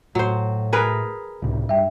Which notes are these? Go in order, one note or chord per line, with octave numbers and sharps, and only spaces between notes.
A2 F#3 C5
G#4 A#4 B4
C#2 A2 C3
G2 E5 G5